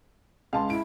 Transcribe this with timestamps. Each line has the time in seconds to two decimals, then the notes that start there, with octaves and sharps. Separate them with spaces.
0.53 C#2 F5 A5 C6
0.70 E4 D7